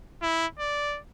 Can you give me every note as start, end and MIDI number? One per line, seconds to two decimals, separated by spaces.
0.22 0.47 64
0.59 0.99 74